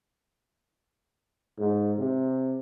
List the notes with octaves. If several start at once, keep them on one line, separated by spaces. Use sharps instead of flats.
G#2
C3